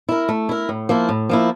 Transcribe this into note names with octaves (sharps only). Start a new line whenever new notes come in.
E4 A#4
A3
E4 A#4
A2
F3 A#3 E4
A2
F3 A#3 E4